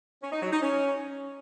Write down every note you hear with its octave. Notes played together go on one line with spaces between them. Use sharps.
C#4
D#4
F#3
D#4
C#4